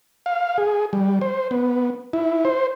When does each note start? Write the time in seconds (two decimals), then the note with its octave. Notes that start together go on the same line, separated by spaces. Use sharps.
0.26 F5
0.58 G#4
0.93 G3
1.21 C5
1.51 B3
2.13 E4
2.45 C5